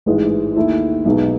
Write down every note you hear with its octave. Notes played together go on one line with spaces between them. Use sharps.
A1 G#2 E3 G#3
D#2 D#3 A3 E4
B1 B2 G#3 D#4